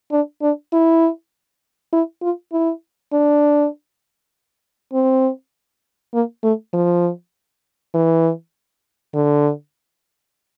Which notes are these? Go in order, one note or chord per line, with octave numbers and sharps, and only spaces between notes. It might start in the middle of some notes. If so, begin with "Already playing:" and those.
D4
D4
E4
E4
F4
E4
D4
C4
A#3
A3
F3
E3
D3